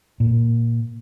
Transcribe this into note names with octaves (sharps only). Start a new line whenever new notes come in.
A#2